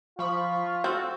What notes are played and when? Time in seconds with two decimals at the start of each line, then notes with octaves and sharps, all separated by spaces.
0.19 F3 F4 B5 C#6
0.84 C4 F#4 A4